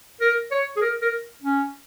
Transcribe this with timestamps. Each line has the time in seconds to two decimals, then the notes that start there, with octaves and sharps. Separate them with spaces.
0.21 A#4
0.51 C#5
0.77 G#4
0.81 A#4
1.02 A#4
1.43 C#4